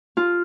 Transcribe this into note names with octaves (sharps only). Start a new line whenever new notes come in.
F4